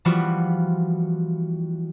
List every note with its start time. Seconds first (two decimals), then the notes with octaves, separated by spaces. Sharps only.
0.05 E3 F3 G3 B3 F4 F#4